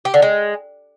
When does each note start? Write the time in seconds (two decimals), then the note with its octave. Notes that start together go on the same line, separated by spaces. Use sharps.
0.05 G4
0.14 D3
0.22 G#3